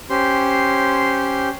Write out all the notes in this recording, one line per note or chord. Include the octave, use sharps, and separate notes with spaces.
C#4 G4 C5 C6